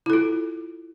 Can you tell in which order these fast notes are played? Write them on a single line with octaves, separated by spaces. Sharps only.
E4 A4 F4